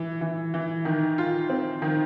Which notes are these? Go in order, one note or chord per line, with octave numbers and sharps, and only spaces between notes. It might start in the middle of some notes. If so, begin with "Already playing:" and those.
Already playing: E3
E3
E3
D#3
F4
C4
D#3